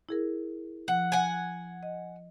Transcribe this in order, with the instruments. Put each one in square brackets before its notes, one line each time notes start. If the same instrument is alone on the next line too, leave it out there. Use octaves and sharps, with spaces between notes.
[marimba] E4 G#4 A#4
[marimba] F3 [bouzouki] F#5
[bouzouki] F#5 G#5
[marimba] D#5